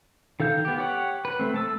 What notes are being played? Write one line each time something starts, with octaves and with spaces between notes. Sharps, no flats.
D#3 A4 F5 G6
B3 G4
G4 C#5 F#5
B4
A3 C4
A3 A5 E6